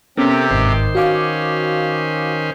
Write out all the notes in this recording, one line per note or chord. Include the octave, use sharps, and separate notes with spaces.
C3 B3 C#4 G4 A4 A#4 B6
G1 G#2 D#3 C5
C#4 F#4 F5 D6